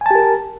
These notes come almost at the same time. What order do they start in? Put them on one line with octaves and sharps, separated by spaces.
G#5 A5 G4 A#4